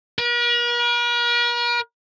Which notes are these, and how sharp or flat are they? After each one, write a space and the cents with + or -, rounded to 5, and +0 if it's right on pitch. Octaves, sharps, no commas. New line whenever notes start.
A#4 +45